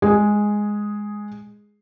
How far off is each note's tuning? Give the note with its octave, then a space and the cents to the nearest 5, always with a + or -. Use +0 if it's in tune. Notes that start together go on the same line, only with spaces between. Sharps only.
G#3 +0 G#4 +0